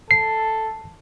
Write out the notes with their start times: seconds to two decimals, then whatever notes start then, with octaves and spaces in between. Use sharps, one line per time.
0.11 A4 C7